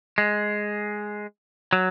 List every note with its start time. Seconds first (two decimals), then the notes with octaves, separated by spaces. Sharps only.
0.18 G#3
1.73 F#3